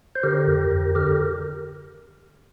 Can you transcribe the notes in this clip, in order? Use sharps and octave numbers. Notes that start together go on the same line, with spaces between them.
C5
D3 G4 A#4
F2
F2
D3 G4 A#4